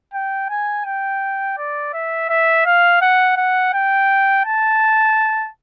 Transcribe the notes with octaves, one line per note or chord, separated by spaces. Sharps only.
G5
G#5
G5
D5
E5
E5
F5
F#5
F#5
G5
A5